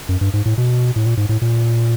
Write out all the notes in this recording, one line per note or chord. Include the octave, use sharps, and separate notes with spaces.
F#2
G2
G#2
A2
B2
A2
A#2
G#2
A2
A#2